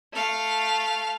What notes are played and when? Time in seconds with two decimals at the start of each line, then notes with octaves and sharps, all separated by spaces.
0.13 A3 F5